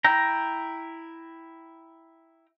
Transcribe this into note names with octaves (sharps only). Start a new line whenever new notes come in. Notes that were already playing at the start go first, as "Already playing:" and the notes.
E4 G5 A#5